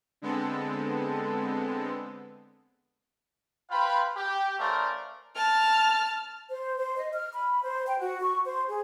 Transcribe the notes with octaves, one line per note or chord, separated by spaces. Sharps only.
D3 G#3 B3 C4 A4
F4 B4 C5 F5 G5 B5
G4
A3 C#4 A#4 C5 D5 F5
A5 F6
C5
C5
D#5
F6
B5
C5
G5
F#4
C#6
C5
G#4